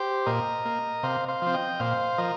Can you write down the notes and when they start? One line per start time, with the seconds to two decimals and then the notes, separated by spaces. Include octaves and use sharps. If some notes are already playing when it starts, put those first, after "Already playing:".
Already playing: G4 C5
0.26 A#2 A#4 D#5
0.65 A#3
1.03 C3 C5 F5
1.28 C5 F5
1.42 F3 C4
1.54 D#5 G5
1.80 A#2 C5 F5
2.18 F3 A#4 D#5